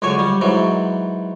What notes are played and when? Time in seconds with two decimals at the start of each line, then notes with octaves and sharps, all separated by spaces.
0.02 C#2 F#2 D3 C#5 G#5
0.19 G3
0.41 G#2 E3 F#3